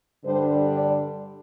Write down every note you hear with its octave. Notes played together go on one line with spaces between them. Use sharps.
G2 D3 G3 D4 C5
D5